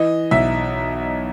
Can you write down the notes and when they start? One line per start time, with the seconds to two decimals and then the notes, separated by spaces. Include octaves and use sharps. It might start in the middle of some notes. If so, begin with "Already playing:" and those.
Already playing: E3 D#5
0.31 B1 E5